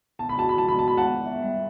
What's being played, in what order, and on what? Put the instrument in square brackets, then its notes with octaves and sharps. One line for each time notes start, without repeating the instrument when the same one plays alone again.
[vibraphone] B3 [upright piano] A5
[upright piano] B5
[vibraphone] F#4 [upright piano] A5
[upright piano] B5
[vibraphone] F#4 [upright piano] A5
[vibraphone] B3 [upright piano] B5
[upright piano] A5
[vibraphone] B3 [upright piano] B5
[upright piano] F#5 A5
[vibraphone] B3
E5
G3